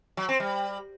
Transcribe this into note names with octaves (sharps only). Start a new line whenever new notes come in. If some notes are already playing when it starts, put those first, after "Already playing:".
F#3
C4
G3